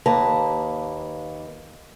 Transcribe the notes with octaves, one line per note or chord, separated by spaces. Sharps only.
D#2 A#3 B4 A5 A#5